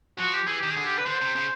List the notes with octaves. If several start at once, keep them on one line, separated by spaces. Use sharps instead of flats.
F3 F#4
G4
E3 G#4
D#3 G4
D3 G#4
G4
B4
D3 C5
C3
C#3